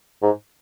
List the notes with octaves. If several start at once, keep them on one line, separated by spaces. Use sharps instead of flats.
G#2